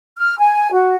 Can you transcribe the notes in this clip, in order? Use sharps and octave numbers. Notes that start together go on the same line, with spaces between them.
F6
G#5
F#4